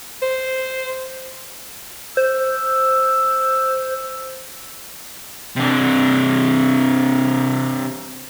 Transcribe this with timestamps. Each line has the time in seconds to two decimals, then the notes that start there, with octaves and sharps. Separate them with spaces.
0.22 C5
2.17 C5 E6
5.56 C3 D4